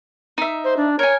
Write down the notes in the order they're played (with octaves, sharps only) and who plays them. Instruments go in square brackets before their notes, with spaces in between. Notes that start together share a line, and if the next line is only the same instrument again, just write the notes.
[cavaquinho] D#4 E5
[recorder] C5
D4
[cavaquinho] A#4 G#5 [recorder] C#5